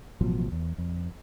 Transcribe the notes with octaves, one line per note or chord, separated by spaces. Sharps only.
A1 B2 F3 F#3
E2
F2